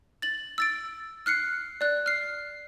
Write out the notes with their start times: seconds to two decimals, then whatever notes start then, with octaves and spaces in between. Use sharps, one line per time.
0.22 A6 F#7
0.58 E6 A6 D7
1.26 F6 F#6 C7 C#7
1.81 D5 F#6
2.06 F6 C7